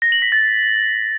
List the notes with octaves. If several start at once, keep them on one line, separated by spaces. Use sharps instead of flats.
A#6
F#7
B6
A6